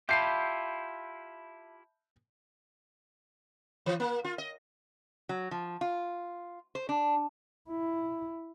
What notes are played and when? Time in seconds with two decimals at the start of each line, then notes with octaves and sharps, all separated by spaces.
0.09 E4 F4 G4 E5 A5 B5 G6 C7
3.86 E3
4.00 A#3
4.24 F4
4.38 D#5
5.29 F#3
5.51 F3
5.81 F4
6.75 C5
6.89 D4
7.69 E4